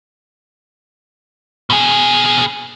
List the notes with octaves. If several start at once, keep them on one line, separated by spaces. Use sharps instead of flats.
B2 G#4